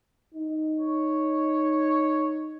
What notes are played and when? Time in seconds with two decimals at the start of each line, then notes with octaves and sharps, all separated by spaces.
0.34 D#4
0.80 C#5